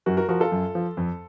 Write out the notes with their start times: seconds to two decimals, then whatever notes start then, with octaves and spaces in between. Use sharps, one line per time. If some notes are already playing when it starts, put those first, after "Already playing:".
0.06 F#2 F#4 A#4
0.17 F#4 A#4
0.29 F3 F#4 A#4
0.40 F4 A4
0.52 F#2
0.75 F3
0.97 F2